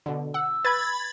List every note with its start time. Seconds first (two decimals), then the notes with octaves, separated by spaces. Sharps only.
0.06 B2 D3
0.34 F#5 E6
0.65 B4 B5 G#6 A6